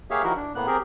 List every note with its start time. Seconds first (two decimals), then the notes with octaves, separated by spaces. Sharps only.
0.11 A#3 G4 G#4 C#5 E5 F5
0.23 D#3 F3 E4 F#4 A#4
0.36 D4
0.55 A2 A#3 B3 F#6
0.67 C4 G4 G#4 A#4